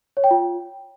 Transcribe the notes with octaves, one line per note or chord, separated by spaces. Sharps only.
C#5
G5
F4